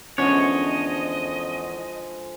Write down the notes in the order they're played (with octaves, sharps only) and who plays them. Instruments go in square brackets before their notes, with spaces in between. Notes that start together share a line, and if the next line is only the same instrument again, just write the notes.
[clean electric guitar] E2 C#5 [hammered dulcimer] D3 F3 G#3 [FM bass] C#4 [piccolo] D#5